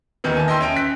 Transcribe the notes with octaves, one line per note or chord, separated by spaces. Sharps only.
D#2 D#3 E3 B3
G#5 A5
D#5 E5 G5 C6 E6
C#4 G5 D7
F#6 B6